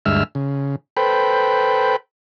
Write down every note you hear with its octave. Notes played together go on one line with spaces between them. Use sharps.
D2 G2 G#3 E5 E6 F6
C#3
A4 B4 C5 G5 B5